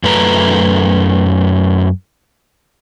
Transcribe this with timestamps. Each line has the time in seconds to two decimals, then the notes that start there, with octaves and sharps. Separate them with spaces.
0.03 F#2 A3 B4 A5 A#5